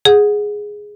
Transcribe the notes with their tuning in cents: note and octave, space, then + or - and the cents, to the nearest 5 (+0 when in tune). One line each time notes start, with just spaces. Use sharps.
G#4 +0 F#5 -15